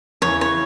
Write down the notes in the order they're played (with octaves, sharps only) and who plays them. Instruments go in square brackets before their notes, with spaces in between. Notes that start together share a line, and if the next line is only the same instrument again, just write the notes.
[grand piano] E2 C#3 E3 [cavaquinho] C#5
[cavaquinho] C#5